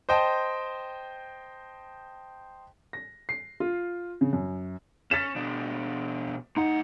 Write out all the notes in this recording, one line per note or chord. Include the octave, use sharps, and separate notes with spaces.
C5 D#5 G5 A5
A#6
C7
F4
C#3
F#2
C#4 A6 B6 E7
B2 D4
A2 D#4 F#5